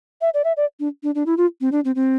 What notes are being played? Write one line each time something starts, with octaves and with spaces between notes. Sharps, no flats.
E5
D5
E5
D5
D4
D4
D4
E4
F4
C4
D4
C4
C4